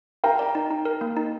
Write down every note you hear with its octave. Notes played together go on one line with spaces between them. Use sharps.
A#4 G5 A#5
D5
D#4
D#4
A#4
A#3
D#4